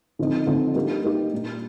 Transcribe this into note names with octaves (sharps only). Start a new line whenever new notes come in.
D3 F3 C4 D#4
D3 F3 C4 D#4
G3 A#3 D#4 G4
G3 A#3 D#4 G4
A#2 G3 D4